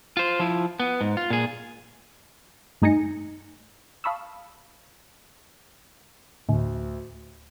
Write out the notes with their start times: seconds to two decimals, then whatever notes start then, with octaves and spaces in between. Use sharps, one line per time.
0.17 F4 C5
0.40 F3 E4
0.80 B3
1.01 G#2
1.17 F4
1.30 A#2 G#4
2.82 G2 A3 D#4 G#5 A#6 C#7
4.04 F5 A5 B5 C#6 D#6 E6
6.49 D2 A2 D3